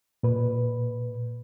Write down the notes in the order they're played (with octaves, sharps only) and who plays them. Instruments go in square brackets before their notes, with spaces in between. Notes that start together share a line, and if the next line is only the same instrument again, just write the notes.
[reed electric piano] A#2 B4